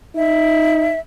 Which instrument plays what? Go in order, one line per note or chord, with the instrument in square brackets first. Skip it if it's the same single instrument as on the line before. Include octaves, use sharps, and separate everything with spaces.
[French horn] D#4 [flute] E5